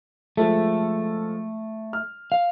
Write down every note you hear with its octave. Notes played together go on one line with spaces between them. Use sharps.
F3 G#3 A3 A4
F6
F5